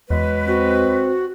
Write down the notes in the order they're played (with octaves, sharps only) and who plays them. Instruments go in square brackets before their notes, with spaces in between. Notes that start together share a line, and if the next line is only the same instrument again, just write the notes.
[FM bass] E2 [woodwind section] F#3 G#3 B4
[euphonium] C4 [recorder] F#4